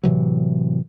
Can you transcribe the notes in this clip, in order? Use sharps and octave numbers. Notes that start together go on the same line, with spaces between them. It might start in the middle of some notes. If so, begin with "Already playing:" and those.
A2 C3 E3 F#3